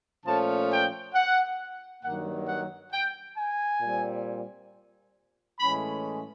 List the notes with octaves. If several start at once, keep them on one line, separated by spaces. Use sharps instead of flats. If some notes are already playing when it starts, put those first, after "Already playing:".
A#2 F3 A3 C#4 A5
G5
F#5
G2 D#3 F#3 A#3 F#5
F#5
G5
G#5
A#2 G3 C4
A2 E3 G#3 C#4 B5